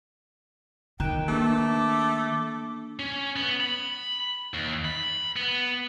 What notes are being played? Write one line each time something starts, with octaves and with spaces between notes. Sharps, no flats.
D#3 G5 A#5 F#6 E7
A3 A#3 D4 D6
C#4
B3
B5
D#2
B5
B3